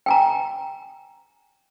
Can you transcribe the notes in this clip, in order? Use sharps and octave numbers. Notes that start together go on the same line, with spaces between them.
G5 G#5 A#5